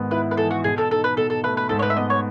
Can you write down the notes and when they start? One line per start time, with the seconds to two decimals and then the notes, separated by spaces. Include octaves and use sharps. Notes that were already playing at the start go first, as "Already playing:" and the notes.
Already playing: G#2 D#3 B3
0.11 E4 B4
0.31 B4
0.37 E3 A4
0.51 F#4
0.64 B2 G#4
0.78 A4
0.91 D#4 A4
1.04 B4
1.17 B2 A4
1.30 A4
1.44 A3 B4
1.57 B4
1.69 G#2 A4
1.79 C#5
1.82 B4
1.90 E5
1.97 B3 D#5
2.10 C#5